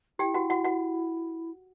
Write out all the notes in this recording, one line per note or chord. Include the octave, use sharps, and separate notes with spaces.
E4 G4 G5
F#4 F#5
F#4 F#5
F#4 F#5